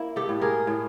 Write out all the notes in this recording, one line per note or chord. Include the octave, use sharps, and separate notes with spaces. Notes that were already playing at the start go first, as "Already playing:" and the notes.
Already playing: A#3 E4
G4 A4
A2
G#4 A#4
A2